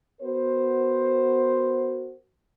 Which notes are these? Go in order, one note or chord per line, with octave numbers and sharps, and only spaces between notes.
B3 F#4 A#4 C5